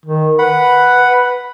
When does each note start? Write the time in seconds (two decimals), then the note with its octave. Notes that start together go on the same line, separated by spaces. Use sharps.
0.06 D#3
0.39 B4 F#5 B5